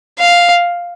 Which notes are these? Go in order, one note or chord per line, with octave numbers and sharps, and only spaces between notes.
F5